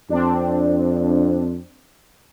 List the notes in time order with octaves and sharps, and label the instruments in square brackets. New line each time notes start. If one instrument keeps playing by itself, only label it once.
[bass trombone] F2 [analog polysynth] C4 D4